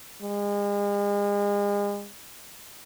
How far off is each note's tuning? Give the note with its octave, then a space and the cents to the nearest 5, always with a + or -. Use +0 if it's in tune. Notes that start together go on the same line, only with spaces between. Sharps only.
G#3 -40